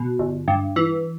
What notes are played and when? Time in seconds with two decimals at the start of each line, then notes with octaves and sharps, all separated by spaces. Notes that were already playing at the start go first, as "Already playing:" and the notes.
Already playing: B2
0.19 G1
0.48 G2
0.76 E3